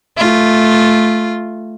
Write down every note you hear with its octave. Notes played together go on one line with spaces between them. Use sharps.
A3 F4